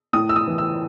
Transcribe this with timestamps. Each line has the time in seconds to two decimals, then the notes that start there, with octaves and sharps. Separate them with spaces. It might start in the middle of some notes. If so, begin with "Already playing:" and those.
0.13 A2 D#6
0.29 E6
0.36 D#6
0.48 E3
0.58 E6